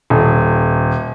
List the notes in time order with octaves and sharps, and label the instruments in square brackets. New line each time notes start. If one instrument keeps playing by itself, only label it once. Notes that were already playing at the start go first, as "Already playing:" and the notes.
[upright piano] D#1